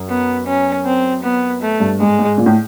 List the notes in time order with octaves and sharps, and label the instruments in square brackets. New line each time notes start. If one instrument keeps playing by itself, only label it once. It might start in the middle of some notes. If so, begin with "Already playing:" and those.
Already playing: [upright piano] F#2
[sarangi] B3
C#4
C4
B3
A3
[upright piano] G2
[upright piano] G#2 [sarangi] G#3
[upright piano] G#2
A#2
A2